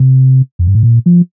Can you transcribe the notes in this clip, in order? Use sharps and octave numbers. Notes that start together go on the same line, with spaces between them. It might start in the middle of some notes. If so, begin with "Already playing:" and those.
Already playing: C3
F2
G2
A2
A#2
F3